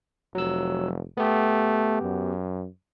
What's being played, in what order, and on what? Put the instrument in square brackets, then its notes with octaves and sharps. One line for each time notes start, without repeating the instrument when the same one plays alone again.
[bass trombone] F1 [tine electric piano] F#3 E6
[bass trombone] A3 [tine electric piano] B3 G4
[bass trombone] F#2